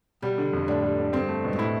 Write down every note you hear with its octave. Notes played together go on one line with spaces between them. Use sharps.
B2 G3
D3
F2
A2 D4
G3
D3
G2 C4
A3
B2
G2
A2 E4